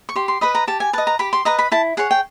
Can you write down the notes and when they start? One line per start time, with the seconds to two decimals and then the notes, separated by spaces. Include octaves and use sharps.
0.09 C#6
0.16 G4 C6
0.28 C6
0.41 B4 D#5 B5
0.55 A#5
0.67 G4 A5
0.80 G#5
0.93 B4 A5
0.98 D#5
1.07 A#5
1.19 G4 B5
1.33 C6
1.45 B4 D#5 A#5
1.59 B5
1.72 E4 A5
1.97 G#4 C#5 F#5
2.11 G5